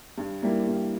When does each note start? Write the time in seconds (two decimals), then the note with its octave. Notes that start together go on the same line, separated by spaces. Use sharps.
0.18 G2
0.42 G3 A#3 E4
0.67 G2